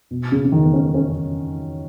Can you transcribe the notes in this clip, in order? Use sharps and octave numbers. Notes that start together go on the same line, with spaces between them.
B2
C#3
C#3
D#3
B3
C#4
C#4